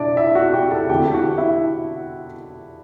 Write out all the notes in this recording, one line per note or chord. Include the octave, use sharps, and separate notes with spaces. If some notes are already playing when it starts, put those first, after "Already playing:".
Already playing: B2 D4 E4 D5
E4 E5
F#4 F#5
G4 G5
A4 A5
E2 D3 A3 C4 G4 G5
F#4 F#5
E4 E5